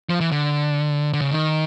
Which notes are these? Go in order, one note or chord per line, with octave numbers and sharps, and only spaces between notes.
F3
E3
D3
D3
C#3
D#3